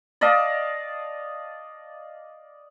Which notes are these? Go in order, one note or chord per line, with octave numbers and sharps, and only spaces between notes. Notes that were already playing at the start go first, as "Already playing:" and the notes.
D5 D#5 F5 A5